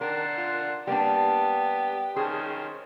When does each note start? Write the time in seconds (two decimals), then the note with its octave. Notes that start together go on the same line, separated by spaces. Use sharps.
0.01 D#3 D4 A#4 F#5 C6
0.37 F4
0.87 G3 A#3 B3 D4 G4
2.16 D#3 C#4 G#4 C5